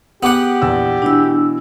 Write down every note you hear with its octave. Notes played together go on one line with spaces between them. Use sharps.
B3 G4 G#4 F#5 D6
A#1 E2 E6
B2 E3 D4 E6